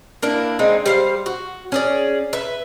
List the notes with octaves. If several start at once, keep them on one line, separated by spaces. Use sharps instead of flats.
A#3 D4 E4
G#3 C4 D#4
G3 C5 F5
F#4
C#4 G#4 D5
B4 E5